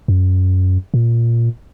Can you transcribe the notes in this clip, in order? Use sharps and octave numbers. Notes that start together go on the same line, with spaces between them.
F#2
A#2